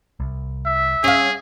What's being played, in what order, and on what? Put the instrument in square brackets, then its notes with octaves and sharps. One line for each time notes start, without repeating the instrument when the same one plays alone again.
[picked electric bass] C2
[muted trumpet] E5
[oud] C#4 F5 [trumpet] G#4